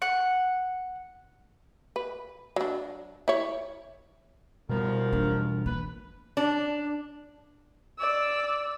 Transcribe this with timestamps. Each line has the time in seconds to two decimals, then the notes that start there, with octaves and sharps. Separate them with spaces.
0.02 F#5
1.96 B4
2.56 F#3 D4
3.28 E4 C#5
4.69 D#2 B2 F3 G3 B3 A#4
5.13 E2 D4
5.66 E3 B4
6.37 D4
7.99 D5 E6